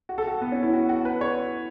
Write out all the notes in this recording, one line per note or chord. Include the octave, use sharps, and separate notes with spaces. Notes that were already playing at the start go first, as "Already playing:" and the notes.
F#4
A4
F#4
B3
C#4
E4
F#4
F#4
B4
C#5